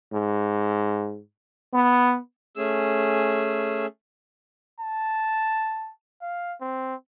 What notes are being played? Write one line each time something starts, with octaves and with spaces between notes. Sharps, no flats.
G#2
B3
A3 C#4 G#4 E6
A5
F5
C4